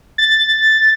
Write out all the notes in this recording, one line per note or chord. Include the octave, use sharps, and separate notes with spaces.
A6